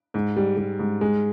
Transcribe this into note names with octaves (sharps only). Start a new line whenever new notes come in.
G#2
G3
G3
G#2
G#3